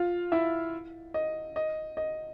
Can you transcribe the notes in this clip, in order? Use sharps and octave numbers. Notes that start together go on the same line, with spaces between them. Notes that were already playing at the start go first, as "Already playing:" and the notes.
Already playing: F4 F5
E4 E5
D#5
D#5
D#5